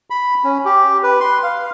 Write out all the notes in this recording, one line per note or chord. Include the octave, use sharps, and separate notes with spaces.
B5
C#4
G4
B4
C6
F5